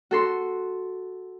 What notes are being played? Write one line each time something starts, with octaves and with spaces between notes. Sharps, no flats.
F#4 A4 C6